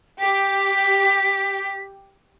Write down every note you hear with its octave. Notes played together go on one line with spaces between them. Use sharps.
G4 B6